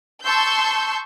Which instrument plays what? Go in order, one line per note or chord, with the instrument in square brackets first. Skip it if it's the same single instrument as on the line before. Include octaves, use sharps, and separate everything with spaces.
[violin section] A5 C6 C#6 E6 G6